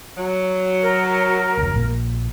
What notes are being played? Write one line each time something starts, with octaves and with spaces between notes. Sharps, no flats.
F#3
A#4
F1 D2
A#1 A#2 A#3